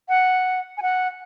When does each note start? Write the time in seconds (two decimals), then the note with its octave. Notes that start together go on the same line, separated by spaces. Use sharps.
0.09 F#5
0.77 G#5
0.82 F#5